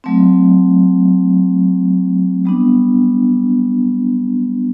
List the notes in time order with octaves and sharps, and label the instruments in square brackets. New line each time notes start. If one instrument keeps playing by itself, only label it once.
[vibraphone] F#3 A3 C4
G3 B3 D4